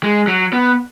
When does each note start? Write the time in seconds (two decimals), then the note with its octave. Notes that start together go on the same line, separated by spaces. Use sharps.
0.03 G#3
0.27 F#3
0.53 B3